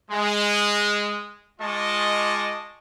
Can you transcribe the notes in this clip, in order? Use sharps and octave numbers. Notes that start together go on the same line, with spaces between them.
G#3
G#3 F4 D#5 A5 C#6 D6